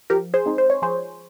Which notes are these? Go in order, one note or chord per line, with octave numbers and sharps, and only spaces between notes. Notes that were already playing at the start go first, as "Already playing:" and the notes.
F3 G4 A#4
G#4 C5
G#3 C4 D#4
C5
C#5
F3 G#4 C5